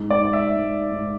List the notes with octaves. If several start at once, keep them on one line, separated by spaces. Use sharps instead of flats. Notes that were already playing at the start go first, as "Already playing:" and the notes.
Already playing: G#2
D5
G#2
E5
G#2
G#2